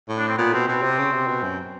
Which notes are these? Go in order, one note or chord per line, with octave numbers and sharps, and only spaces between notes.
A2
D4
C4
A#2 B3
B2 C4
B2 C4
C3
C#3
C3
B2
F#2